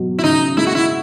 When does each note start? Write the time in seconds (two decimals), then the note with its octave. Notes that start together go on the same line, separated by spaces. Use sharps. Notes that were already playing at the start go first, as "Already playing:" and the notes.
Already playing: B2 F#3
0.19 E4
0.24 C#3 D#4
0.57 G#3 E4
0.67 F#4
0.75 E4